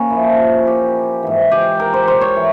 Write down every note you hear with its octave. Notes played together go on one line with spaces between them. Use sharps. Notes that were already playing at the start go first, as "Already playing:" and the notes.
Already playing: A#3 C#4
A#2 F3 E4
G4
G#2 E3
G4
A#4
C5
C5
C#5
E3